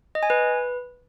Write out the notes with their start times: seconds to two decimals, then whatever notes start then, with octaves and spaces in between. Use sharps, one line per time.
0.15 D#5
0.23 G#5
0.30 B4